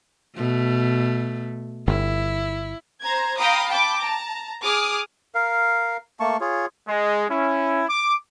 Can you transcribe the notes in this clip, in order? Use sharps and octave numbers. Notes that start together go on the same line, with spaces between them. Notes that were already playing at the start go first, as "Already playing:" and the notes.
B2 A3
G1 E4
C5 A#5 G#6
F5 G5 A#5 B5 D#6
G5 A5 B5 D6
A5 A#5
G#4 D6 D#6 F6
A#4 F5
A3 A#3 A5 C#6
F4 G#4 C#5
G#3
C#4 E4
D6